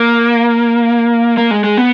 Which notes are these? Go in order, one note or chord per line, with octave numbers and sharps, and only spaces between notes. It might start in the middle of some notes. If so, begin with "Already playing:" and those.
Already playing: A#3
A#3
G#3
G#3
B3